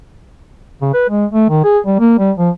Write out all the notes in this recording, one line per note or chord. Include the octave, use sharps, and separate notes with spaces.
C#3
B4
G#3
A3
D#3
G#4
G3
A#3
G3
F3